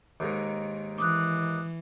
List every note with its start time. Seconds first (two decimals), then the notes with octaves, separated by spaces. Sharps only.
0.20 D#2 G#2 D#3
0.98 E3 D6 D#6 F#6